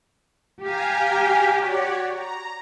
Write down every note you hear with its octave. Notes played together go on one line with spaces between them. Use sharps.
G4 F5 G#5 A#5
F#4 C#5 D5
A#5